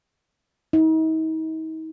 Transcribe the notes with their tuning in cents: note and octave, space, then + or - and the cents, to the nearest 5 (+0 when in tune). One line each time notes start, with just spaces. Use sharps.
D#4 +40